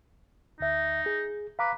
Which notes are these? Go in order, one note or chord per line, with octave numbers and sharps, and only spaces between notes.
D2 D#4 E5
G#4
B4 F5 A#5 D6